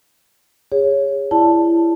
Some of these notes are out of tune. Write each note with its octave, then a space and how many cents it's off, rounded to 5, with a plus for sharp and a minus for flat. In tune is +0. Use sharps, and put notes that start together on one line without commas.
G#4 -30 C#5 +0
E4 +25 D5 +0 A5 +0